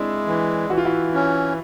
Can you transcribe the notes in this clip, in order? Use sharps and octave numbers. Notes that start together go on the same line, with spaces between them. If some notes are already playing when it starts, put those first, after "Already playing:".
Already playing: G#3 C4 D4 E4
E3
E3 F#4
F4
E4 F#4
C#4